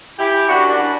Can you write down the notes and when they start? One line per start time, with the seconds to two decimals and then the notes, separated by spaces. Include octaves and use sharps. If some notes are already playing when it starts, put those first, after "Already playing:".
0.18 E3 E4 G4
0.48 F#2 D4 F#4
0.69 D4 F#4
0.78 E3